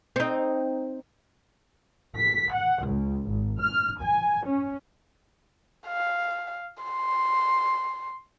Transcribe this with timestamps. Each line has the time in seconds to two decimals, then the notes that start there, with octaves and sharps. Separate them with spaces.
0.16 C4 D#4
2.16 B6
2.54 F#5
2.84 C#2
3.29 G#1
3.60 F6
4.00 G#5
4.47 C#4
5.87 F5
6.83 C6